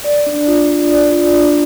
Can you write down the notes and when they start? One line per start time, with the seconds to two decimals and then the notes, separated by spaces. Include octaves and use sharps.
0.04 D5
0.27 D4
0.47 F4
0.70 F4
0.91 D5
1.12 F4
1.34 D4